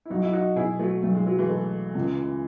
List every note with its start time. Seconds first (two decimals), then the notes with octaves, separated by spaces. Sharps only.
0.05 E4
0.10 B1 D#4 F#4
0.23 E4
0.33 D#4 F#4
0.56 B2 E4 G#4
0.79 F#3 A3
1.03 B1 A3
1.15 G#3
1.27 F#3
1.39 E3 G#3
1.49 A3
1.95 C#2